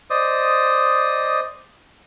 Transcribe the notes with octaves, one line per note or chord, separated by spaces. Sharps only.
C5 D5 D#5 D#6